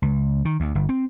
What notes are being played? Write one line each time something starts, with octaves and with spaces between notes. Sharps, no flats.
C#2
D#3
D2
G1
C4